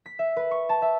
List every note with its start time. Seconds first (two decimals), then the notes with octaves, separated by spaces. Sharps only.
0.06 B6
0.19 E5
0.36 B4
0.51 C#6
0.69 A5
0.82 E5